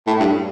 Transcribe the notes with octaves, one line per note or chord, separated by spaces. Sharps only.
A2
G2